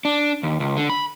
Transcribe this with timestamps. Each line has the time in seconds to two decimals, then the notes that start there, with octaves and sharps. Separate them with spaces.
0.05 D4
0.43 D#2
0.60 C#2
0.77 D3
0.90 B5